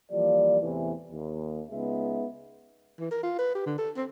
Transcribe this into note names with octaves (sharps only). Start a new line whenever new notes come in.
E3 F3 G3 A#3 D5
E2 A2 C3 E3
D#2
C#2 G#3 B3 D#4 E5
E3
A#4
F4
B4
G4
D3
A4
C4